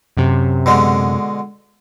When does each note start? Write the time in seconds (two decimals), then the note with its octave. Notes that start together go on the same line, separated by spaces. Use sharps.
0.17 F#2 C3
0.66 B2 D3 G#3